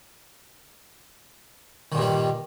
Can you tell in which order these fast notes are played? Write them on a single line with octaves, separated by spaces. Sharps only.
D#3 A#2 G2 G3